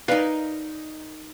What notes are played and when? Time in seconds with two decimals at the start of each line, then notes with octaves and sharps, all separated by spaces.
0.08 D#4 A#4 B4 D5 F5